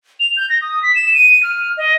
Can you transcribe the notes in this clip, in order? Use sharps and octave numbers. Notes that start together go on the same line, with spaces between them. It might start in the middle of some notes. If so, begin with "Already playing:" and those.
F7
G6
A#6
D#6
B6
E7
D#7
F6
D#5